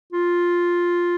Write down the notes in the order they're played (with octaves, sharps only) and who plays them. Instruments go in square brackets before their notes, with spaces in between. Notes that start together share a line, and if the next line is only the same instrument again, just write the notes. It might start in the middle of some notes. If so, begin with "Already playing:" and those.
[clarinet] F4